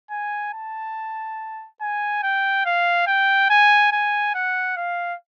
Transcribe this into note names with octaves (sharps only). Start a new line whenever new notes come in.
G#5
A5
G#5
G5
F5
G5
G#5
G#5
F#5
F5